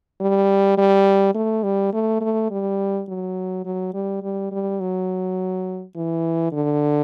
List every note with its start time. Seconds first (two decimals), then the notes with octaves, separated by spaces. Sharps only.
0.21 G3
0.78 G3
1.35 A3
1.63 G3
1.93 A3
2.21 A3
2.51 G3
3.08 F#3
3.65 F#3
3.94 G3
4.23 G3
4.52 G3
4.81 F#3
5.96 E3
6.52 D3